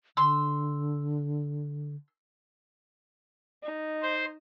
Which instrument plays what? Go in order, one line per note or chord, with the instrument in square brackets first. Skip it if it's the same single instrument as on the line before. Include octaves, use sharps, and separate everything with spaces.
[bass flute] D3 [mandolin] C6 E6
[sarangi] D#4
[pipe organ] C5